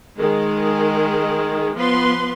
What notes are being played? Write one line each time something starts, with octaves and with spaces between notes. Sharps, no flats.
D#3 G#3 G#4
F3 B3 B4 C6